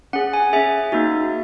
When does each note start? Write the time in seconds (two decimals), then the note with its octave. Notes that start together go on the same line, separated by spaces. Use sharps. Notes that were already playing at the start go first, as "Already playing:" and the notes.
0.13 C#4 G#4 F#5
0.33 G#5
0.53 C#4 G#4 E5
0.92 A#3 D#4 F#4